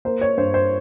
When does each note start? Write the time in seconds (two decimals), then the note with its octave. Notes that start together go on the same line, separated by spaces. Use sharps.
0.05 A#3 C5
0.21 C#5
0.37 G2 C5
0.54 C5